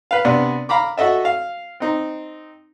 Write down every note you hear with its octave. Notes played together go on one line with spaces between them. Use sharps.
B4 F5
C3 B3 D4
F5 A#5 B5 D6
F#4 A4 D#5 E5
F5
C4 D#4